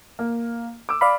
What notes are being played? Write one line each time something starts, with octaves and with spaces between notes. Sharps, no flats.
A#3
D6 E6
D5 F5 B5